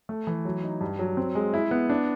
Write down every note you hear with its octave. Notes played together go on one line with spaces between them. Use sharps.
A3
E3
F#3
D#4
G2
F#3
C4
G#3
E4
B3
D4